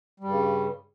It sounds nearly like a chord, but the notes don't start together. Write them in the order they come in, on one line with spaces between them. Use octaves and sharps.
G3 G2 C#3